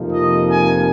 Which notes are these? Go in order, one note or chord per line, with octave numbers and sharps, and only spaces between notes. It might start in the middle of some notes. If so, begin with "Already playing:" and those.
Already playing: F2 C3 F3 A#3 D#4
D#5
G#5